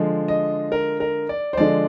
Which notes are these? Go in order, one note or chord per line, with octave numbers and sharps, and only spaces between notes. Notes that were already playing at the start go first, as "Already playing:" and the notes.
Already playing: D3 F3 G#3
D#5
A#4
A#4
D5
C5
D3 F3 G#3 D5